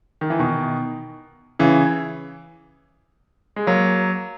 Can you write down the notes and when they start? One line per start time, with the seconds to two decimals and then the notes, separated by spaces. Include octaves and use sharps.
0.21 D#3
0.30 E3
0.39 B2 D#3
1.59 C#3 E3
3.56 G#3
3.67 F#3 A#3